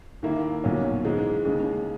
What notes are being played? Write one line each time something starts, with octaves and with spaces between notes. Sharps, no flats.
D#2 D#3 A#3 E4
B1 A#2 F#3 C#4
G#2 E3 G#3
D#2 C#3 G#3